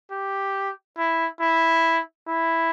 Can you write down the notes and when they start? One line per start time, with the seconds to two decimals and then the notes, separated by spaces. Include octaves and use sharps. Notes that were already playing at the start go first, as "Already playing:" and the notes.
0.11 G4
0.97 E4
1.41 E4
2.28 E4